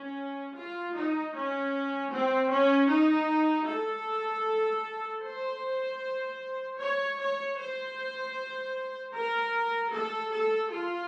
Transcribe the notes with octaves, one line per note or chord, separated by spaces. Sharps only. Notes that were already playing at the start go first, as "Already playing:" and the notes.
Already playing: C#4
F4
D#4
C#4
C4
C#4
D#4
A4
C5
C#5
C#5
C5
A#4
A4
A4
F4